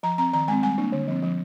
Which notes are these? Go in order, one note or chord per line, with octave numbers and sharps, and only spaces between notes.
F3 A#5
C4 A#5
D#3 A#5
G#3 C4 G#5
G3 G#5
A#3 D4
D3
F3 C4
F3